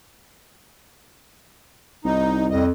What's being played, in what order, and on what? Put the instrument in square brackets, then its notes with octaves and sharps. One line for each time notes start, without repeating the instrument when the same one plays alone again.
[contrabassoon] C2 [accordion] D#4
[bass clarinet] F2 [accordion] G3 D#5